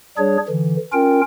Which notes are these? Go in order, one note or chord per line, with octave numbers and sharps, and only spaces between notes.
G3 D4 G#4 C#5
D3 E3
C#4 F4 A#4 G5